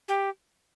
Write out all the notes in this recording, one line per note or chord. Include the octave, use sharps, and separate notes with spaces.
G4